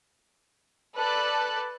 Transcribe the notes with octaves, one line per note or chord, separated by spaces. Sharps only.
A4 B4 D5 A5 F#6